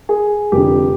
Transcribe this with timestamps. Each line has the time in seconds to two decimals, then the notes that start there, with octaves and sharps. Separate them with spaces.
0.09 G#4
0.52 F1 F2 D3 G4